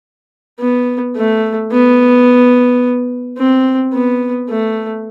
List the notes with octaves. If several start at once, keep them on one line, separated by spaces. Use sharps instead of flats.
B3
A3
B3
C4
B3
A3